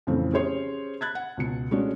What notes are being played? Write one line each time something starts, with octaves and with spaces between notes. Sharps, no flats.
F2 A#2 C#3 E3 A3 C4
C#4 G4 G#4 C5 C#5 C6
B5 F#6 G#6 A6
F#5
C#2 B2 C#7
G#3 A3 C#4 D4 F#4